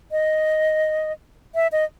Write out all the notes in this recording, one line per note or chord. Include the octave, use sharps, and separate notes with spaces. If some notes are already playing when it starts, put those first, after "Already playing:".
D#5
E5
D#5